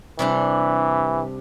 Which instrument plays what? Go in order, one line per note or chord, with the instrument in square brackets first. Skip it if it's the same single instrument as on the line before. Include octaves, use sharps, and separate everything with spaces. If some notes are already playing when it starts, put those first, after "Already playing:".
[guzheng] C3 G3 D4 [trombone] E3